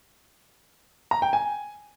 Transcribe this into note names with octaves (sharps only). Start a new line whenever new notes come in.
A#5
G5
G#5